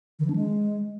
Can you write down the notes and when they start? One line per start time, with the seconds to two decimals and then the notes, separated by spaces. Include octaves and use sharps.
0.19 D#3
0.25 E3
0.30 D4
0.35 G#3